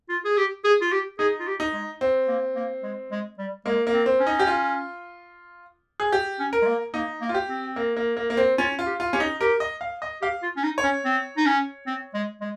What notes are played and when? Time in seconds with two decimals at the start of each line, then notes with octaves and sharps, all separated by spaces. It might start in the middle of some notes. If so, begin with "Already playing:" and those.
0.09 F4
0.25 G#4
0.37 G4
0.64 G#4
0.81 F4
0.92 G4
1.19 D#4 G#4
1.40 F4
1.47 G4
1.60 D#4
1.73 G#3
2.01 C4
2.28 A#3
2.56 A#3
2.83 G#3
3.11 G#3
3.38 G3
3.65 G#3 A#3
3.87 A#3
3.93 C4
4.06 C4
4.20 C#4
4.27 D#4
4.39 G4
4.47 F4
6.00 G#4
6.12 G4
6.39 C#4
6.53 A#4
6.62 G#3
6.67 A#3
6.94 A#3 D#4
7.21 A#3
7.29 F4
7.34 G4
7.49 C4
7.76 A#3
7.97 A#3
8.17 A#3
8.30 A#3
8.37 C4
8.58 C#4 F4
8.79 F4
8.86 G4
9.00 F4
9.13 C#4 G4
9.20 D#4
9.41 G4 A#4
9.60 D#5
9.81 F5
10.02 D#5
10.22 G4 F5
10.43 F4
10.57 C#4
10.64 D#4
10.78 C#5
10.83 C#4
11.05 C4
11.37 D#4
11.46 C#4
11.87 C4
12.14 G#3
12.41 G#3